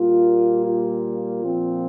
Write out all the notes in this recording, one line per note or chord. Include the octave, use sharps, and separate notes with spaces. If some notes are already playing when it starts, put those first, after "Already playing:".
Already playing: A#2 G3 A#3 F4
F4
A#2 F3 C4